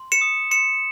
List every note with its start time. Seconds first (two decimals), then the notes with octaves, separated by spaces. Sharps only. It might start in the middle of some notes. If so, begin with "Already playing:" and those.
Already playing: C6
0.12 C#7 E7
0.21 D#6
0.51 C6 C#7 E7